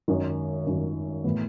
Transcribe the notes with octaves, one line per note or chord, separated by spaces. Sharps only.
G#1 F#2 D#3
G#1 F#2 D#3
A2 E3 B3